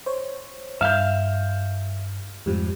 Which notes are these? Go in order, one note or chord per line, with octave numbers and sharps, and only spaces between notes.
C5 C#5
G2 E5 F5 F6 G6
F2 G#2 F3 G3